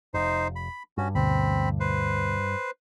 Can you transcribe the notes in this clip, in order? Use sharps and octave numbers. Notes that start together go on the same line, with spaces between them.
F1 D#4 C5
B5
G2 C#4 F#4
D2 B2 C4 B5
B4 C5